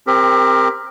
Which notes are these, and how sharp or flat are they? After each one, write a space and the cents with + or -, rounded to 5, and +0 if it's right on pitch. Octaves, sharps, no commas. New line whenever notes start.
C4 +0 G4 +30 A#4 +0